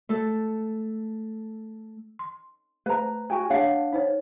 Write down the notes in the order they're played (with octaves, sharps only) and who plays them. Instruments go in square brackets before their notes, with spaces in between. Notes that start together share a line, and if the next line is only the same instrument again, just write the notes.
[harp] A3 A4 E6
[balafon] C6
[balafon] A3 C5 [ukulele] B4 A#5
[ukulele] F#4 G5 G#5
[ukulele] D4 F5 F#5 [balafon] C#5
[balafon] D#4 C5 C#5